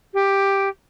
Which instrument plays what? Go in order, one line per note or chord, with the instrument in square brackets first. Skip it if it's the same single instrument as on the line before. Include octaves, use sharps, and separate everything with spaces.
[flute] G4